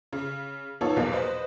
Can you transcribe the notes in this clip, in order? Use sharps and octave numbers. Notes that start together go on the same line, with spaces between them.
C#3
F3 A#3 B3 D#4 A4 C#5
A#1 E2 B2 F#3 A#3
B4 C5 D#5